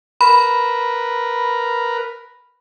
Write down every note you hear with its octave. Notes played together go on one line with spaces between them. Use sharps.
A#4 B4 B5